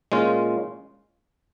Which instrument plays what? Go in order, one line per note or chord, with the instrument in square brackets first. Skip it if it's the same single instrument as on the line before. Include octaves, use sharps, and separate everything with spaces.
[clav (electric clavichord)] A#2 G#3 C#4 F4